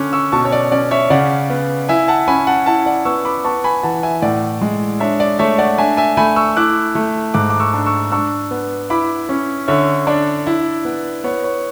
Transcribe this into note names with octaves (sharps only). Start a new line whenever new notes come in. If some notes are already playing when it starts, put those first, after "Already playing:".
Already playing: D3 C#4 D6 F#6
C#6 E6
B2 A5 C#6
C#5
D5
C#4 D5
C#5 E5
C#3 D5 F#5
B3
E4 E5 G#5
F#5 A5
C#4 G#5 B5
F#5 A5
E4 F#5 A5
D5 F#5
B3 C#6 E6
B5 D6
B3 A5 C#6
G#5 B5
E3 F#5 A5
E5 G#5
A2 D5 F#5
G#3
D4 C#5 E5
D5
A3 C#5 E5
D5 F#5
D4 E5 G#5
E5 G#5
A3 G#5 B5
C#6 E6
E4 D6 F#6
A3
G#2 D6 F#6
D6
C#6 E6
D4
C#6 E6
D4 C#6 E6
B3
E4 B5 D6
C#4
D3 C#5 E5
D4 D5
E4
B3
B3 C#5
C#5